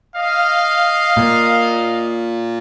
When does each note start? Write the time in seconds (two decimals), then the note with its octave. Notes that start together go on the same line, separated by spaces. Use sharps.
0.14 D#5 F5
1.17 A#2